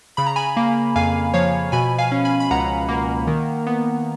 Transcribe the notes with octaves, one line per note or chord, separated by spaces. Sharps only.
C#3 B5
A#5
G#5 B5
A#3
F2 F5 G#5
F3 C#5 F5
B2 G#5 B5
F5 G#5
C#4
G#5 B5
B5
C#2 F#5 A#5
A#3
D#3
B3